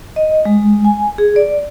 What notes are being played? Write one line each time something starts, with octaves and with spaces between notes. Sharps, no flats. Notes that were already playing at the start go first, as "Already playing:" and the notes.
D#5
G#3
G#5
G#4
D5